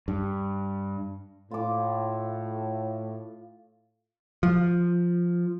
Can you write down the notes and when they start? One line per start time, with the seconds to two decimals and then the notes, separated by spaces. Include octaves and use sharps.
0.08 G2
1.51 A2 F4 D6
4.43 F3